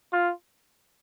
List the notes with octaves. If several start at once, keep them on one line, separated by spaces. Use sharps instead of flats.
F4